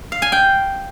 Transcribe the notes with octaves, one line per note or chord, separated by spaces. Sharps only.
F5
G#5
G5